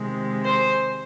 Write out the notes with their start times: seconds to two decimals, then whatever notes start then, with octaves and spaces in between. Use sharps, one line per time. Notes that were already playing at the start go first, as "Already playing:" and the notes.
Already playing: C3 D#3 G#3
0.44 C5